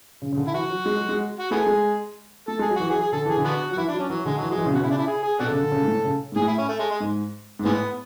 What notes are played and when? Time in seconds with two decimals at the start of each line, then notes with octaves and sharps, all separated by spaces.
0.22 C#3
0.32 C#3
0.37 D3
0.47 E4
0.54 E3 F#4
0.71 F#3
0.86 G#3
0.97 F#3
1.09 G#3
1.39 F#4
1.51 A3 B3 E4 G#4
1.66 G#3
2.48 A3 A4
2.59 G#3
2.62 G#4
2.70 F#3
2.76 E3 F#4
2.90 F#3 G#4
3.01 G#4
3.12 D3 A4
3.25 E3 G#4
3.37 D3
3.45 B3 D4 F#4
3.70 F#3
3.73 F#4
3.77 E3 E4
3.88 D4
3.94 F#3
3.99 C#4
4.10 E3 F#3
4.25 D3 G#3
4.38 E3 F#3
4.50 F#3 G#3
4.58 E3
4.66 C#3
4.73 B2 F#4
4.81 C#3 E4
4.90 D4
4.98 E4
5.07 G#4
5.23 G#4
5.39 B2 D4 F#4 A4
5.50 C#3
5.61 D3
5.72 C#3
5.82 G#2
5.88 A2
6.05 C#3
6.32 G#2
6.36 A2 G#4
6.47 E4
6.58 C#4
6.69 A3
6.79 G#3
6.91 G#3
7.00 G#2
7.59 G#2
7.65 A2 E3 G#3 B3